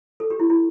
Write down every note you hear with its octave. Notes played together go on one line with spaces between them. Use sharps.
A4
G4
E4
E4